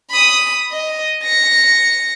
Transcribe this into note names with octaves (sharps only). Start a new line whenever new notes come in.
B5 D#6
D#5
A#6 C#7